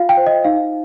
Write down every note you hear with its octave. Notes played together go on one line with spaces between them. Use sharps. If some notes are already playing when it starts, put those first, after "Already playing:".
Already playing: F4 F5
G5
C5
D#5
D#4 F5